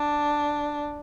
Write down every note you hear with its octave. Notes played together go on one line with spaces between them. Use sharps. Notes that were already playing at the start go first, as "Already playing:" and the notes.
Already playing: D4